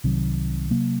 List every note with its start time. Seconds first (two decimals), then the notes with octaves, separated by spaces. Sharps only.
0.04 C2 C3 D#3 F#3
0.70 C3 F#3 A#3